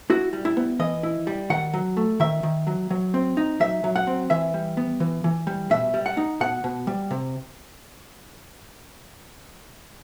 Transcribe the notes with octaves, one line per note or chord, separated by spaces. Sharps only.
E4 F#4
G3
E4
B3
E3 D#5
E4
G3
D#3 F#5
F#3
A3
D#3 E5
D#3
F#3
F#3
C4
D#4
F#3 E5
F#3
F#5
C4
E3 E5
G3
B3
E3
E3
G3
B2 E5
G3
F#5
D#4
B2 F#5
B2
G3
C3